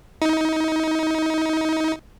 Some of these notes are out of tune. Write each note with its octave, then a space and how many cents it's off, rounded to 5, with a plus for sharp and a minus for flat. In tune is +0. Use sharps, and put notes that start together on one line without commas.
D#4 +30